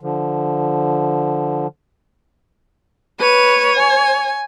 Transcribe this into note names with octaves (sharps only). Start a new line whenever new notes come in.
D3 F3
B4 C#5 D#7
G#5